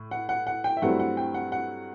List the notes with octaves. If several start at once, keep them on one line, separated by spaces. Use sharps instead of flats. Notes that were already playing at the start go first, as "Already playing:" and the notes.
Already playing: A2
F#5
F#5
F#5
G5
E5
G2 F#3 A3 C4 E4 F#5
F#5
G5
F#5
F#5